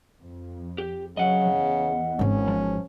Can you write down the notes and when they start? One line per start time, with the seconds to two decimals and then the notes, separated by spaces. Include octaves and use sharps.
0.21 F2
0.78 G4
1.17 C#3 F#3 D#5 F#5
1.54 E2
2.19 G#1 G#2 C#4
2.48 F3